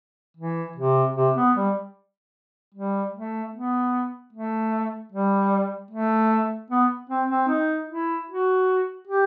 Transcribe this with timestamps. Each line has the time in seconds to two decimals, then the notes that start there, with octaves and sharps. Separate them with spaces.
0.37 E3
0.76 C3
1.16 C3
1.36 B3
1.56 G3
2.74 G3
3.14 A3
3.53 B3
4.33 A3
5.12 G3
5.91 A3
6.70 B3
7.10 C4
7.30 C4
7.48 D#4
7.89 E4
8.29 F#4
9.07 G4